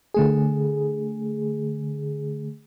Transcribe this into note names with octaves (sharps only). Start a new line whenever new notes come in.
D3 A3 G#4